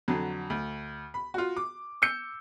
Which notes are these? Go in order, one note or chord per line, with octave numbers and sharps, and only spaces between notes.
F2 D3 F#3
D2
B5
F4 F#4
D6
E6 G6 C#7